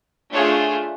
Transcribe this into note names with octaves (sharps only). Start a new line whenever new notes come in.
A3 D4 F4 G#4 C#5